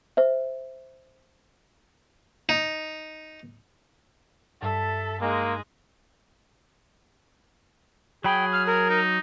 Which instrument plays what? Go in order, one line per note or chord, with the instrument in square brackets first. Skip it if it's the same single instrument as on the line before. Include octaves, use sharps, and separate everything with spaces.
[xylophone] C5 E5
[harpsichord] D#4
[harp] G2 A6 [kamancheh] A4 [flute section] E5 A5
[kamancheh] G#3 [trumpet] A#3 [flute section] D#4 G#4
[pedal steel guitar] F#3 B5 [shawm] G#4 [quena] G5
[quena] F6
A#4
[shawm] D#4